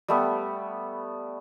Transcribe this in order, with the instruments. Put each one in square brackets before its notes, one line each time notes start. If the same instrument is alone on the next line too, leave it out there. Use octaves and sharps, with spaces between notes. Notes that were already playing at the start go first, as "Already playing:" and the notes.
[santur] G3 A3 B3